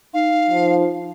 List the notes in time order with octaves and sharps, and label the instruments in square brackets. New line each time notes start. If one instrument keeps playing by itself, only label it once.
[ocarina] D#4 [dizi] F5
[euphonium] F3